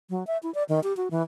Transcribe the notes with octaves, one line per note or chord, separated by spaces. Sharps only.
F#3
E5
E4
D5
D#3
G4
F#4
E3